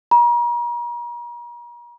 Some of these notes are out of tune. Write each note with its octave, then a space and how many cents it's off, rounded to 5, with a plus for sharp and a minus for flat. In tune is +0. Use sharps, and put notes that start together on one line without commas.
A#5 +40